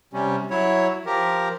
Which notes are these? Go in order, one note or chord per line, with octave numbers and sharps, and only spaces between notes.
C3 G3 C#4
F#3 E4 C#5
F3 G4 A#4